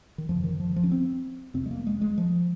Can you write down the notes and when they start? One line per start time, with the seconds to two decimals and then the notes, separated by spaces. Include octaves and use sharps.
0.18 D#3
0.29 F#2 C#3 F3
0.44 D#3
0.60 F3
0.76 F3
0.84 C#4
0.92 C4
1.54 F2 C3 C4
1.66 G#3
1.71 A#3
1.87 G#3
2.01 G#3
2.18 F3